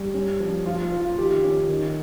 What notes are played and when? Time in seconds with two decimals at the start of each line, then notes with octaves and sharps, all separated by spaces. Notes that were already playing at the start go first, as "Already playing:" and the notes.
Already playing: G3
0.14 C#4
0.40 F3
0.65 F3 F4
0.83 F4
0.92 F3
1.00 F4
1.18 D#3 G4
1.44 C#4
1.69 D#3